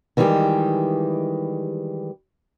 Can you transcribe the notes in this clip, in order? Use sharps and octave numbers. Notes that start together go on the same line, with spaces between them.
D#3 E3 G3 G#3 G4